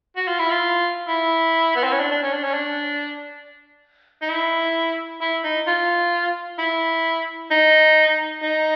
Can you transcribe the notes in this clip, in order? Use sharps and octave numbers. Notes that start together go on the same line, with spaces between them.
F#4
F4
E4
F4
E4
B3
C4
C#4
D4
D4
C#4
D4
C#4
D4
D#4
E4
E4
D#4
F4
E4
D#4
D#4